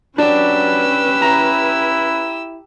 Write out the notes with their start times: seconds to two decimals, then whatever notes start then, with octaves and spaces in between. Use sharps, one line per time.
0.18 F#3 C#4 D4 G4 B4 E6
1.22 E4 A#5